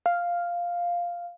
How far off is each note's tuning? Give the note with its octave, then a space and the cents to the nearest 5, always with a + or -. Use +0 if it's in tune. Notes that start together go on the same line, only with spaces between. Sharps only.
F5 +0